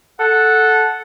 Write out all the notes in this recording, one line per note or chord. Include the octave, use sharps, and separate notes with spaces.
A4 F#5